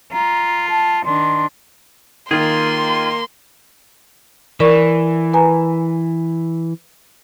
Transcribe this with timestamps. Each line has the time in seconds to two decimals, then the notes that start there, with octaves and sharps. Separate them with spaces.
0.13 F4 A#5
0.69 A5
1.05 D#3 D4 C6
2.31 D#3 A#3 F4 G#4 C6
4.60 E3 A#4 D5 C#6
5.33 B4 G#5 A#5